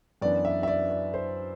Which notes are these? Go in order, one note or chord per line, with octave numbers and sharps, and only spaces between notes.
F#2 E3 B3 D4 D5
E5
E5
D5
D5
C5